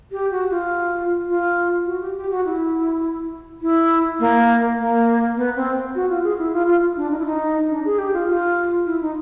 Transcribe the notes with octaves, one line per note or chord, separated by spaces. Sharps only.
G4
F#4
F4
F4
F#4
G4
G4
F#4
E4
E4
A#3
A#3
B3
C4
F#4
F4
G#4
E4
F4
F4
D4
D#4
E4
D#4
D4
G#4
G4
F4
F4
E4
D#4